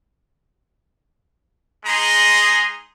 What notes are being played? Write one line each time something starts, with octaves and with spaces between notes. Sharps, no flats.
G#3 D#4 G#4 A#5 C6